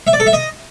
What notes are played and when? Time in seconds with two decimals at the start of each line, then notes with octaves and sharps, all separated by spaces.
0.07 E5
0.13 D5
0.20 A4
0.26 E5
0.33 D#5